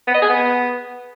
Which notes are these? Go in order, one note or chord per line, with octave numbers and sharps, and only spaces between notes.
B3
D#5
G#4
B3